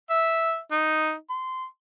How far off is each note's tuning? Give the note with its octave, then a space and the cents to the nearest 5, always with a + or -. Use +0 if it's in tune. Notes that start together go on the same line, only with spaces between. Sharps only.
E5 -5
D#4 +0
C6 -20